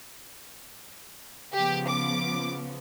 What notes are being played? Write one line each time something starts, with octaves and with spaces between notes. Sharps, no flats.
C#3 F3 B3 G4
D6